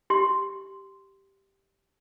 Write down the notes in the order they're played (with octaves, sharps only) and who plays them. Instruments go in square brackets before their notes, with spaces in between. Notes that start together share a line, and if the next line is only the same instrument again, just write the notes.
[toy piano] G4 C6